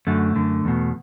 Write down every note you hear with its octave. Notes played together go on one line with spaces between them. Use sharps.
F#2 D3 A3
F#2 D3
E2 B2